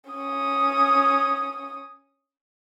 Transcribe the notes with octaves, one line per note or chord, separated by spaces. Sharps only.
C#4 D#6